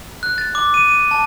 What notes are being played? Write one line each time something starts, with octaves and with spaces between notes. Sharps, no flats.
F#6
A6
D6
D#7
D#7
A5